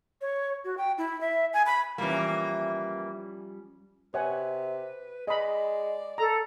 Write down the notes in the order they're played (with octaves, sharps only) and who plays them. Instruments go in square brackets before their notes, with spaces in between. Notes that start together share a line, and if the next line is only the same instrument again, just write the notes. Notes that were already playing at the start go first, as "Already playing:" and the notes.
[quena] C#5
F#4
G5
E4
E5
G#5
B5
[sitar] E3 A#3 [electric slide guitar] F3 G3 C#4
[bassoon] C3 [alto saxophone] B4 [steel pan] C#5 F#5 G#5
[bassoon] G#3 [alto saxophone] D5 [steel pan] D#5 B5
[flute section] A4 [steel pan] A#5